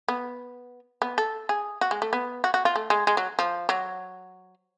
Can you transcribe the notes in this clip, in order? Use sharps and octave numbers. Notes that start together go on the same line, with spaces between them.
B3
B3
A4
G#4
F#4
G#3
A3
B3
F#4
F#4
F4
A3
G#3
G#3
F#3
F3
F#3